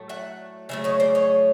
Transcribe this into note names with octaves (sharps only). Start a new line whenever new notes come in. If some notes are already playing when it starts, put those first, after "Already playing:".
Already playing: A2 F#3 A3
E5 F#5
C#3 F#3 A3 E5
C#5 D#5
C5 D5
C#5 D#5